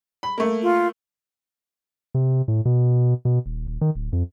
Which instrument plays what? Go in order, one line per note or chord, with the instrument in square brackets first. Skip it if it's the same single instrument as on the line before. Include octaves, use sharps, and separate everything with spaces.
[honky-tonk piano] B5
A3 A#3
[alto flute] F4
[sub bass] C3
A2
B2
B2
D#1
D#1
D#3
D1
F2